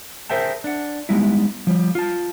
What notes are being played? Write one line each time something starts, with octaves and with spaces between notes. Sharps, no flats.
G#4 A#4 C5 E5 G5 A5
D4 F#5
G3 G#3 B3 D#4 E4
F3 G3
F4 A5